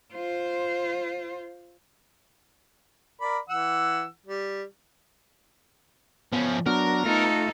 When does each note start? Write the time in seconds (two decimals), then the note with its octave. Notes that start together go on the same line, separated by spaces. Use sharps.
0.13 F4 C5
3.21 A#4 D5 B5
3.49 E3 F#5 E6
4.26 G3
6.33 F3 B3 C#4
6.66 F#3 B3 D4 A#4
7.05 A3 D#4 F4 A4